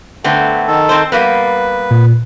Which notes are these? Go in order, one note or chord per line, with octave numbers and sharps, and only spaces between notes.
D3 A3 B3 C4
D#3 A4
C4 C5
G3 A#3 B3 B4
A#2